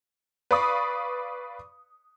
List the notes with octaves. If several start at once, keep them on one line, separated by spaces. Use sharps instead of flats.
B4 D5 F5 B5 C#6 D#6